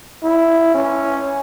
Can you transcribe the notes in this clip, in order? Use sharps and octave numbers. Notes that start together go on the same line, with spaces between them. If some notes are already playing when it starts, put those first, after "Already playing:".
E4
C#4